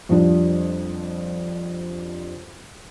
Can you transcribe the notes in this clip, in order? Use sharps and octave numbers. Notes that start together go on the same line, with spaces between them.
F2 F3 G3 D4